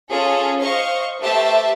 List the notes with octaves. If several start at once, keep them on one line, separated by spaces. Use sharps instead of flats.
C#4 F4 G#4 A4
C5 D#5 F5 C#6
A3 G4 B4 C5 E5 A5